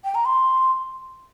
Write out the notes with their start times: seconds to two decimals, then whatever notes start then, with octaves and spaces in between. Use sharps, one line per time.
0.04 G5
0.15 A#5
0.25 C6